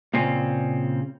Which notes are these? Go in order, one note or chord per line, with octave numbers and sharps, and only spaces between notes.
A#2 C#3 C4 C#4